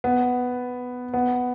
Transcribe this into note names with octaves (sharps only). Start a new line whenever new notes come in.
B3
B3